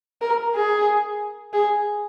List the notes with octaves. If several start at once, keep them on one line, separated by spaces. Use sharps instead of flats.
A#4
G#4
G#4